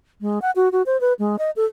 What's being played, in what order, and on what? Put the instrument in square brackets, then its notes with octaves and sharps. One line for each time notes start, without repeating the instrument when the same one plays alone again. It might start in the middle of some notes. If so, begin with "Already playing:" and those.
[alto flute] G#3
F#5
F#4
F#4
C5
B4
G#3
D#5
A4